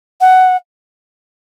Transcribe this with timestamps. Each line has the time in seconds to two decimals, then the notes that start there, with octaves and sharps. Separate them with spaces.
0.21 F#5